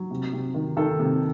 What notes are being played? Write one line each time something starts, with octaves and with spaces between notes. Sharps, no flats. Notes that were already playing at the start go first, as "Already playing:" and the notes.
Already playing: F#3
C3
C3
D#3
D#3 A4
C3